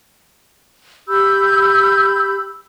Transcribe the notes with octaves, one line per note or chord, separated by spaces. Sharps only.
G4 B5 E6 G6